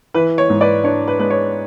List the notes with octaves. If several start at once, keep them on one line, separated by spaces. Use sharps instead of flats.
E3 B4
C#5
G#2
B4 D5
D4 C#5
B4
G#3 B4
C#5